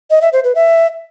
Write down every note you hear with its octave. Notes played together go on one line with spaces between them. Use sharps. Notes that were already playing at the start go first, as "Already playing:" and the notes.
D#5
E5
C5
B4
E5